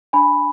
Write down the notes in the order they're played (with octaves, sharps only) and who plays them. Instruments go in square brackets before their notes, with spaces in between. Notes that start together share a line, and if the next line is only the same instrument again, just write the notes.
[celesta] D4 G#5 B5